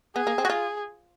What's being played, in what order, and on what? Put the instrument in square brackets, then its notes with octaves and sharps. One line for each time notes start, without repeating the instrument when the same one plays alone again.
[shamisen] B3 [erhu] G#4
[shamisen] A#3
C4
F#4
F4